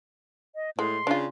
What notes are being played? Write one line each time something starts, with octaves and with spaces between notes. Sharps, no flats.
D#5
A2 G#3 C6
C#3 D4 F4